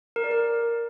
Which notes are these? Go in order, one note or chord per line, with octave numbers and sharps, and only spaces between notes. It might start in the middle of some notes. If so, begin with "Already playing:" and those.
A#4
D5
A#4